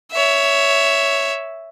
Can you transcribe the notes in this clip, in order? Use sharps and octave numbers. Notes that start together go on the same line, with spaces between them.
C#5 E5